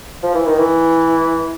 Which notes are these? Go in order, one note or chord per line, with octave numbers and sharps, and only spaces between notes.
F3
E3
D#3
E3